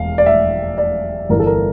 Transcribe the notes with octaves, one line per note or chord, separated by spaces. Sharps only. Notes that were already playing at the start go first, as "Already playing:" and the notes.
Already playing: E1 F5
D5
E5
D5
G1 G2 E3 A#4
A4
A#4